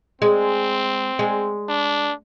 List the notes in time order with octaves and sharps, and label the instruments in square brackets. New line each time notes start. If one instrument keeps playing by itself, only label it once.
[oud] G#3 [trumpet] C4
[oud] G#3
[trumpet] D4